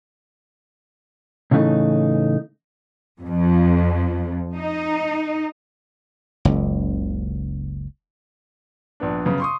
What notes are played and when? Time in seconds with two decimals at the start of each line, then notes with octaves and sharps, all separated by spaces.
1.51 A2 C#3 E3 A3 D#4
3.23 F2
4.57 D#4
6.45 F#1 C#2
9.00 A#1 B3 D4
9.26 F#2 C#3 B3
9.40 C6 C#6 D#6